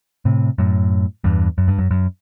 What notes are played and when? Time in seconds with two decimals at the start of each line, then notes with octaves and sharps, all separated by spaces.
0.25 A2 C3
0.58 F#2 A2
1.24 E2 G2
1.58 F#2
1.68 G2
1.78 F#2
1.91 F#2